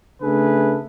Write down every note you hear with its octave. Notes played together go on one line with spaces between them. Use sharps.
C#3 A3 D4 G#4 A4 B4